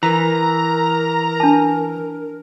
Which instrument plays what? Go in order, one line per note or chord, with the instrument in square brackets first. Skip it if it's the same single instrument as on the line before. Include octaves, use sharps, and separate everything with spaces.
[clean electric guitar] E3 [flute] A#4 [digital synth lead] A#5
[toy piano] D4 A5